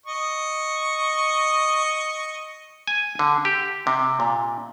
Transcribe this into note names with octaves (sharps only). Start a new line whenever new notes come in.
D#5 C#6
G#5
D3
G4
C3
A#2